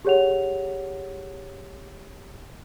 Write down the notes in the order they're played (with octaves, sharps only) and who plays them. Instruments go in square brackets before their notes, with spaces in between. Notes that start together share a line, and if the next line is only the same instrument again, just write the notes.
[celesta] G4 G#4 C#5 F#5 F7